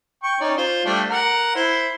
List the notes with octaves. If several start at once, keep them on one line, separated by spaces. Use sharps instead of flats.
G5 C#6
C#4 D#4 D5
F4 C5
G3 A3 D4
A#4 F#5
E4 C5